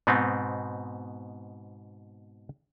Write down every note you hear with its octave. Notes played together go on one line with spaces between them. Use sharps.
G#2 B2 B3 C4 D#4